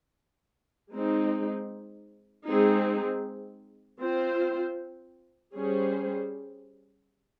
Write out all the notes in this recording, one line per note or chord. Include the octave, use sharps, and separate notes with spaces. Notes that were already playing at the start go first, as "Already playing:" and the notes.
G#3 C4 D#4
G#3 C4 D#4 G#4
C4 F4 C5
G3 C#4 G#4 C5